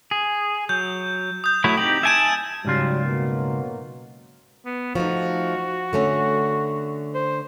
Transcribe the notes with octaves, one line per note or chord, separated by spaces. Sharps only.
G#4
F#3 G6
D#6 G6
F#3 A3 E4
C4 D#4 G4 F#7
E5 G#5 A5 G#6 D7 E7
G#2 C#3 F#3 G3 F4
B2 F#3 A#3
B3
F3 A3 D#4 F#4
D3 A3 C#4
C5